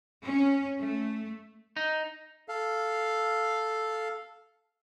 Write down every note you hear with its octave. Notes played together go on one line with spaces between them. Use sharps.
C#4
A3
D#4
A4 F5